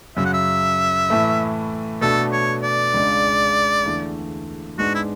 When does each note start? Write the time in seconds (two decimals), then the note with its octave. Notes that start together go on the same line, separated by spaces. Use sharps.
0.17 F#2 C#3 F#3 E5
0.25 F#5
0.33 E5
1.09 A2 E3 A3 E4
2.01 B2 A3 D4 F#4 A4
2.32 C#5
2.63 D5
2.94 C#2 C#3 G#3 D4
3.86 E2 D3 A3
4.78 G#2 G#3 B3 D4 F#4
4.95 E4